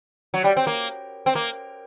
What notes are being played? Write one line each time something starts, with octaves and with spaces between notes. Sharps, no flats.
F#3
G3
C4
A#3
C4
A#3